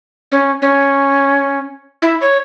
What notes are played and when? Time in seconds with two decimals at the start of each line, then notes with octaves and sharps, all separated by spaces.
0.32 C#4
0.62 C#4
2.02 E4
2.21 C#5